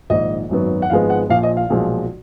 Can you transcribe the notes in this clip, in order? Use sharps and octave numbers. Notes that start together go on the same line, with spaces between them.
A#1 G#2 D#3 D#5
G#1 F#2 D#3 F#3 B3
F#5
G#1 G#2 F3 G#3 B3 F5
F#5
A#1 A#2 F3 F5
D#5
F5
B1 A#2 F3 G#3